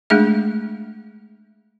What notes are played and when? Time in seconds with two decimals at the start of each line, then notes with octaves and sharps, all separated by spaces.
0.10 G#3 A3 D4 G#4 E5